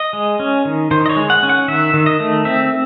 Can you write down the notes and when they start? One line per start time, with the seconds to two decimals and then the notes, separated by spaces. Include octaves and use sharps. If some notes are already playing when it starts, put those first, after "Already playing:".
Already playing: D#5
0.13 G#3
0.40 C#4
0.65 D#3
0.91 D#3 C5
1.06 D#5
1.09 C#5
1.16 G#3
1.30 F#5
1.43 C#4
1.49 F#5
1.68 D#3 E5
1.94 D#3
2.06 D#5
2.20 A3
2.45 C4 E5